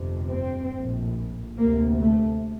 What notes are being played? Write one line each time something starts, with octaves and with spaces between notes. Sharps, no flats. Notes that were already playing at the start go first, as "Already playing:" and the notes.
Already playing: G1 F2 C3
C4
A#1 A2
D2 C3 A#3
A3